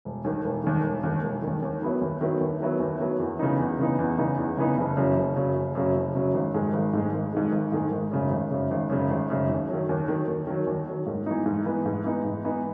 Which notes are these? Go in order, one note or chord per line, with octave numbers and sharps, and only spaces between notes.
E1
D#2 D#3
E1
D#2 D#3
E1
D#2 D#3
E1
D#2 D#3
D#2
D#3 F#3 B3 E4
D#2
D#3 F#3 B3 E4
D#2
D#3 F#3 B3 E4
D#2
D#3 F#3 B3 E4
E2
C#3 E3 B3 D#4
E2
C#3 E3 B3 D#4
E2
C#3 E3 B3 D#4
E2
C#3 E3 B3 D#4
F#1
F#2 C#3 F#3
F#1
F#2 C#3 F#3
F#1
F#2 C#3 F#3
F#1
F#2 C#3 F#3
G#1
G#2 D#3 G#3
G#1
G#2 D#3 G#3
G#1
G#2 D#3 G#3
G#1
G#2 D#3 G#3
G#1
F#2 C#3
G#1
F#2 C#3
G#1
F#2 C#3
G#1
F#2 C#3
D#2
D#3 F#3
D#2
D#3 F#3
D#2
D#3 F#3
D#2
D#3 F#3
G#2
E3 B3 D#4
G#2
E3 B3 D#4
G#2
E3 B3 D#4
G#2
E3 B3 D#4